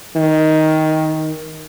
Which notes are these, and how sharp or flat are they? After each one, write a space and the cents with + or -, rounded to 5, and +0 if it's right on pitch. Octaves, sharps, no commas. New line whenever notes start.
D#3 +10